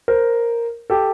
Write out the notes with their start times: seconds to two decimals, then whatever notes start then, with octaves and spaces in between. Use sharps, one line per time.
0.08 A#4 C5
0.90 G4 A4